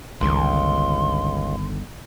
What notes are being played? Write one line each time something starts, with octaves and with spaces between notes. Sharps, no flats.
G1 C#2 D3 D#3 C6